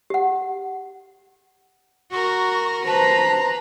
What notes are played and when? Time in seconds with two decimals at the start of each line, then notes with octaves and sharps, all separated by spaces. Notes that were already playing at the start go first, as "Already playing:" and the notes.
0.10 G4 F#5
2.12 F#4 A#4 C#6
2.86 B4 C5 A5 A#5